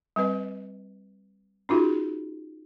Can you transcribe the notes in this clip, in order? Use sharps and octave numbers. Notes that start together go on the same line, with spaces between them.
G3 C4 B4 D#5
C#4 D#4 F4 F#4 G#4